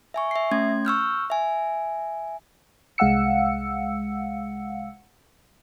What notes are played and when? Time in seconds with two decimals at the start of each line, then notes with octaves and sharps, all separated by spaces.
0.14 E5 G#5 C#6
0.31 E5 C7
0.51 A3 C#4 C6 G#6
0.85 C#6 E6 F6 G6
1.30 E5 G#5
2.98 C2 G#3 F5 F#5 E6 C#7